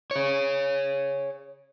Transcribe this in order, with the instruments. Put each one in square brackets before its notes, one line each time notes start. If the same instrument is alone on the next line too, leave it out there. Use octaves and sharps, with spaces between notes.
[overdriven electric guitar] G#4 C#5